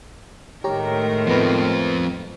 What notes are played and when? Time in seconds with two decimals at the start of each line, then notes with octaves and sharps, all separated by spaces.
0.64 A2 D#3 G#3 A3 G4 A#4 C#5 A#5
1.27 F3 B3 C4 B4